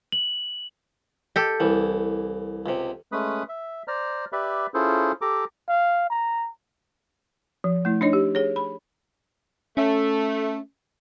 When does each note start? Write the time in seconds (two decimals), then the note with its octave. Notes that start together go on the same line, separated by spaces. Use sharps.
0.12 F#7
1.36 G4 A4
1.60 C2 E3
2.66 C#2 C3
3.12 G#3 A3 C#4 B4 B5 D#6
3.49 E5
3.88 C5 D5 A#5 F6
4.32 G4 B4 D5 E5 B5
4.74 C#4 E4 F4 G#4 A4 C5
5.21 G4 A4 A#5 D6
5.69 F5
6.10 A#5
7.64 F3
7.85 A3 E4
8.01 D4 D#4 C#5 D#5
8.13 G4
8.35 G#4 C#5
8.56 B5
9.77 A3 C#4